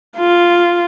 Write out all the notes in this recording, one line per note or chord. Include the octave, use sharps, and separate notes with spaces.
F4